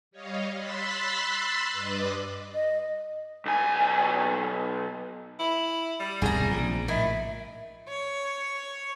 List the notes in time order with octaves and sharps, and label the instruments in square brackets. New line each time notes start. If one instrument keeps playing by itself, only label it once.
[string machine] G3 C#5 D#5 F5
B5 C6 E6 F#6 A6 B6
G2 B4 D5 D#5 D6
[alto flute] D#5
[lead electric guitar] B1 G#5
[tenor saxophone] E4
G3
[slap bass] E1 C2 G#2 [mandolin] G#4 A#5
[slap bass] A#1 C#3 F3
[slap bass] A2 [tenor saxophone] D#3 [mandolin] E4
[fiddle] C#5